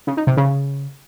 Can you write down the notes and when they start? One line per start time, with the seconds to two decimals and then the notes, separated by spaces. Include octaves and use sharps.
0.07 C#3
0.17 D#4
0.27 C3
0.37 C#3